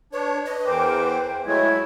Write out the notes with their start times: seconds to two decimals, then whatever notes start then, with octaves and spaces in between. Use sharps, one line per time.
0.13 D4 B4 C#5
0.46 B4 D#5
0.66 E2 E3 A#4 C5 G5 D6
1.13 G5
1.46 F#3 G#3 A3 E4 C#5 G#6